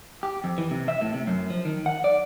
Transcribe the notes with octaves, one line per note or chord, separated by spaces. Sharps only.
G4
F2
E3
C3
E5
A2
C3
F#2
F3
D#3
F#5
D5